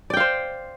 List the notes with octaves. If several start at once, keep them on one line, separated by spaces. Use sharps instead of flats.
C5 D5 F5 G5